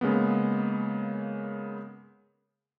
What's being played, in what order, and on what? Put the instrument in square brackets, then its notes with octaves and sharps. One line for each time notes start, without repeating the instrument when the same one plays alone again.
[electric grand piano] C#3 G#3 A#3 B3